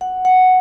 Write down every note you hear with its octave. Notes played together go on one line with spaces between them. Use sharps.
F#5
F#5